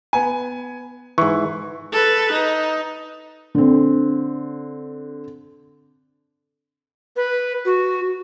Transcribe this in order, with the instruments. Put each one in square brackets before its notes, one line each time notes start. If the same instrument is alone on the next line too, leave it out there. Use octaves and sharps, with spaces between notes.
[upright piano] B3 G#5
[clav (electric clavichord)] G#2 E3 [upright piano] C#6
[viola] A4 B4
D#4
[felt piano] D3 C4
[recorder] B4
F#4